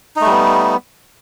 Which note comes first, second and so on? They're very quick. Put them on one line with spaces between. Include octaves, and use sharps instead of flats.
D#4 A3 G3 B3